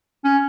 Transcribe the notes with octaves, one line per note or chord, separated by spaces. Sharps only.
C#4